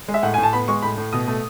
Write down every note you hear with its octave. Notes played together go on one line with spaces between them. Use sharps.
G#3
E5
A2 F#5
A2 G#5
A5
B3 B5
G#3 C#6
A2 B5
A2
B2 D#6
A3